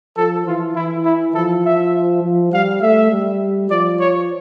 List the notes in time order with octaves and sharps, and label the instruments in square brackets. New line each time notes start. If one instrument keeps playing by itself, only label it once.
[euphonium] F3 [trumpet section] A4
[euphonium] E3 [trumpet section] F4
[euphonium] E3 [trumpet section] E4
[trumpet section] E4
[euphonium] F3 [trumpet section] A4
[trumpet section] E5
[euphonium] F3
[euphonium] G3 [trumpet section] F5
[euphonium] A3 [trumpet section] E5
[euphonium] G3
[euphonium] F3 [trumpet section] D5
[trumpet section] C#5